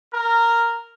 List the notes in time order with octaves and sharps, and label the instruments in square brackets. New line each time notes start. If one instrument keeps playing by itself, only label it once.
[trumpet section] A#4